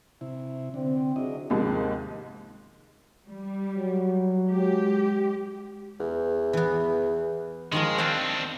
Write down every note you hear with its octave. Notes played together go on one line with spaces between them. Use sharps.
C3 E4
D3 C4
C3 F#3 G#3 D4 E4 D#5
D#2 G#2 C3 F3 C5
G3
F#3
G#3 G4
E2
E3 B3
D#3 F3 G#3 A#4
C4 D4 F5 F#5 A5